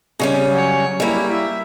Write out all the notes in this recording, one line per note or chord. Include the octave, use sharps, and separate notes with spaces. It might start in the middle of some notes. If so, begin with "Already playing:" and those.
C#3 G3 C#4
F#3 C#5
G3 A#3 E4
E5